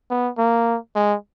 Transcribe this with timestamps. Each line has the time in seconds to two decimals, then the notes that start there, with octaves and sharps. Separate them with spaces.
0.10 B3
0.38 A#3
0.95 G#3